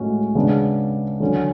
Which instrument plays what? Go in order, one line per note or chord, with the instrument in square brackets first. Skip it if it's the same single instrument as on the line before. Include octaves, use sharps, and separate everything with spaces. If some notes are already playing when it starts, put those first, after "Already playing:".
Already playing: [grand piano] A2 G#3 C#4 F#4
C#3 G#3 B3 D4
D3 F#3 C#4